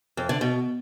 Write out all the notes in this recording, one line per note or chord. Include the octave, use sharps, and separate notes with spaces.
F2
D3
B2